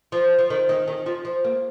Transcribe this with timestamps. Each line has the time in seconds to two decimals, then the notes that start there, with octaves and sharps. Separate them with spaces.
0.12 F3
0.39 F3
0.50 D#3
0.69 D#3
0.88 D#3
1.06 F3
1.25 F3
1.44 A#3